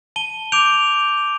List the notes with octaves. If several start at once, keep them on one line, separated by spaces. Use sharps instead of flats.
A5 D#7 G7
D6 G6 D7 F7